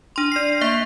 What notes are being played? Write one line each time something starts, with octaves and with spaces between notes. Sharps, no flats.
D4 C6
D5 C7
A#3 E5